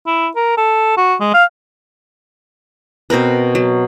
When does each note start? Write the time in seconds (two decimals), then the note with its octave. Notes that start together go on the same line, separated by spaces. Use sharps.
0.06 E4
0.36 A#4
0.57 A4
0.97 F#4
1.20 G#3
1.34 F5
3.10 B2 C4 A#4 B4
3.55 F#3